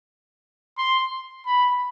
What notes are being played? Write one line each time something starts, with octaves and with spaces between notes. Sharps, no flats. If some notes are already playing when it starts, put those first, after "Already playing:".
C6
B5